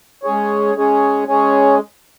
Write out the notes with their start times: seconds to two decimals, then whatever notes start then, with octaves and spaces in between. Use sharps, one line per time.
0.23 G#3 C#4 G#4 C#5
0.75 G#3 C#4 G#4 C#5
1.28 G#3 C#4 G#4 C#5